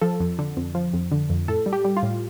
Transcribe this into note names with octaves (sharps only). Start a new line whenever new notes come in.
F3 A4
F2
D3
F2
F3
F2
D3
F2
A2 A4
G3
G4
G3
F4
A2